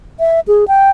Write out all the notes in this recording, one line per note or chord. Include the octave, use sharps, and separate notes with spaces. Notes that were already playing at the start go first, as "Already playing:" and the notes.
E5
G#4
G5